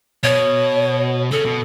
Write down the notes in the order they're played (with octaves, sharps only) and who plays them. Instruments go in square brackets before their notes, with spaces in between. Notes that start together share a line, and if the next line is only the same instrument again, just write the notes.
[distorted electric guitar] B2 [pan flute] C#5
[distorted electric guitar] C#3 [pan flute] A4
[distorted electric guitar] B2